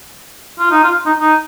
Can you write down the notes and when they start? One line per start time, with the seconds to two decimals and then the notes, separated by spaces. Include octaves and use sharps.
0.59 F4
0.71 D#4
0.84 F4
1.06 D#4
1.20 D#4